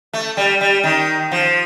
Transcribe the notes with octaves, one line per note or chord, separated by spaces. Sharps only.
A3
G3
G3
D#3
F3